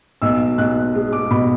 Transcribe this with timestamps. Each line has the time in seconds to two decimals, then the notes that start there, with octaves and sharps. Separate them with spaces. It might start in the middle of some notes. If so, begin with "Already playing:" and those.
0.22 B1 E6
0.58 B1 F#6
0.95 G#3
1.13 D6
1.31 B2 B5